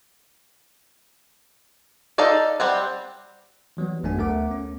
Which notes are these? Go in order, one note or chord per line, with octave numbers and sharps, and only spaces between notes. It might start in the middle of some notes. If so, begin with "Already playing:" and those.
D#4 A4 D5 F5
G3 C4 F#5
E3 F#3 G3 B3
G#1 F#2 A3 B3 D4 G#5
D2 A3 A#4 F#5 D6
B3 C#4